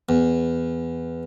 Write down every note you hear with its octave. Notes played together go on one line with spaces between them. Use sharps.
E2